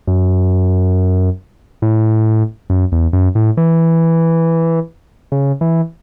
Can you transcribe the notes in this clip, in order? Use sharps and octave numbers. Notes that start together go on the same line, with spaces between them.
F#2
A2
F#2
E2
F#2
A2
E3
C#3
E3